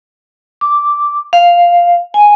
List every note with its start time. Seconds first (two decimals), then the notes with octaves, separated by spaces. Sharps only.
0.61 D6
1.33 F5
2.14 G#5